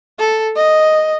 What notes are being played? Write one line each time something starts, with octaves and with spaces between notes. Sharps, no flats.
A4
D#5